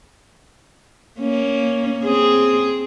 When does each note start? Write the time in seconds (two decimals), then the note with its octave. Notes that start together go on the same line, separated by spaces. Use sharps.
1.20 A#3 C#4
2.05 C4 G#4